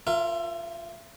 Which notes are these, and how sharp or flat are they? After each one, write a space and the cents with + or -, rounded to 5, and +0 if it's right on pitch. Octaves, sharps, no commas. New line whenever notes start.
F4 +0 A#4 +0 E5 +35